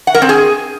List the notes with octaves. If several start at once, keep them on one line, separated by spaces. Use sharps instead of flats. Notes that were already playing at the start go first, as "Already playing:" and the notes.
F#5
A#4
C4
G#4